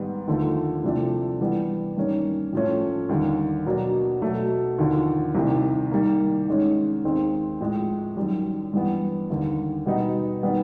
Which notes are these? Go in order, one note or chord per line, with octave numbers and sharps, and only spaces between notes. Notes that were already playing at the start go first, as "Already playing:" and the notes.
Already playing: G#2 D#3 G3 B3
D#2 D3 F3 A3
C2 C3 F3 A3 D4
E3 G3 B3 D4
G2 D#3 G3 A#3 C#4
A2 F3 A3 C#4
D#2 D3 G3
B2 F#3 A#3 D4
B2 F#3 A3
D#2 D3 F3
C2 C3 D#3
D#3 G3 A#3
G#2 D#3 G#3 C#4
D#2 D#3 G#3 C4
A2 F3 G#3
F#2 D#3 G3
G2 E3 G3 B3
D#2 D3 G3
B2 G3 B3 D#4
D#3 G3 B3